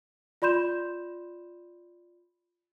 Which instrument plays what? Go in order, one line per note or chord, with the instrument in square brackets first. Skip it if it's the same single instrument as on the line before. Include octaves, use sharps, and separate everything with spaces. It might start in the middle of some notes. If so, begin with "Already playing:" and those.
[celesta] F4 D5 B5 C6 G6 E7